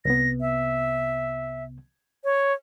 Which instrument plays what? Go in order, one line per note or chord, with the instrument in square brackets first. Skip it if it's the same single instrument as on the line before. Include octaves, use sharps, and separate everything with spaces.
[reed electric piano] C2 C3 B3 [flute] A#6
[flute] E5
C#5